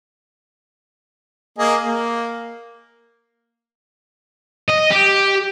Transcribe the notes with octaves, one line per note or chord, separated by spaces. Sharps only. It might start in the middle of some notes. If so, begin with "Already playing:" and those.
A#3 G#4 D#5
A#3
D#5
G4